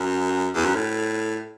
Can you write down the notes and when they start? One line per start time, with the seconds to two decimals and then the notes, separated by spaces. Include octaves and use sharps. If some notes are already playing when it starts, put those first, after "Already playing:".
Already playing: F#2
0.55 E2
0.65 F#2
0.75 A2